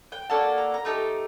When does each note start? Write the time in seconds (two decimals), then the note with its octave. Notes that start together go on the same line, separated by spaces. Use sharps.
0.12 G5
0.30 A#3 D4 F#4 A4 A5
0.58 A#5
0.74 A#5
0.85 A3 D#4 G4 A5